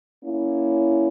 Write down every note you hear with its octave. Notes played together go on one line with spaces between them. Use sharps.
A#3 C#4 E4